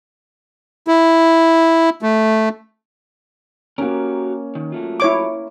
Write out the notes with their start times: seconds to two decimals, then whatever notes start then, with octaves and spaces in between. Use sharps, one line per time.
0.87 E4
2.02 A3
3.78 A#3 C#4 F#4 G4 A#4
4.55 D#3
4.72 F#3 A3 F4
5.00 E4 C#5 D6